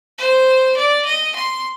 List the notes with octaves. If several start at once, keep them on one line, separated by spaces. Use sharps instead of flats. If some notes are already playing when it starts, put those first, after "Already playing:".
C5
D5
D#5
C6